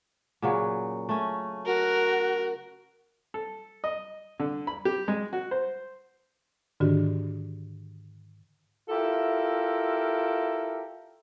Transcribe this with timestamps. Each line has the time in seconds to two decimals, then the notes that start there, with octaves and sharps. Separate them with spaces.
0.42 A#2 C#3 F#3
1.09 A3 C#4
1.66 F#4 A#4
3.34 A4
3.84 D#5
4.40 D3
4.67 B5
4.85 G4
5.08 G#3
5.33 F#4
5.51 C5
6.80 G#2 D3 D#3 D4 F#4 G4
8.89 E4 F4 G4 A4 A#4 E5